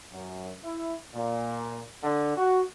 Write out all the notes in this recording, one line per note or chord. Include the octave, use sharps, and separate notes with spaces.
F#2
E4
A#2
D3
F#4